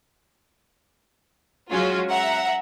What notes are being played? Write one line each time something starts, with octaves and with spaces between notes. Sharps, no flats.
F#3 G#3 C#4 F4 F#4
E5 F#5 A#5